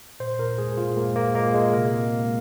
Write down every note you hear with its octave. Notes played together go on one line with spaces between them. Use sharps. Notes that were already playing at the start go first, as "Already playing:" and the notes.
A#2 C5
A#2 A#4
G#3 G#4
A#2 F4
G#3 A#3
A#2 A#3
G#3 A#3
A#2 G#3
C3 A#3
C3
G#3